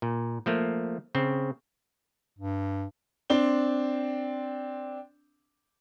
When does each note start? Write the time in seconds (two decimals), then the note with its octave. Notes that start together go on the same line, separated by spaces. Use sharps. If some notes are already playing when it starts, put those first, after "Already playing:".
0.02 A#2
0.46 F3 A3 A#3
1.15 C#3 C4
2.39 G2
3.30 C4 D4 G7